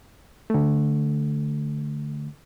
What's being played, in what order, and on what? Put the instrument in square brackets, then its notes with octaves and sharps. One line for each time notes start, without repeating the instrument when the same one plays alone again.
[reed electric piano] D3 A3